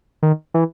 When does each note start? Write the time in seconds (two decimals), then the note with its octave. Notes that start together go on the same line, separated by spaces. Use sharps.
0.23 D#3
0.54 E3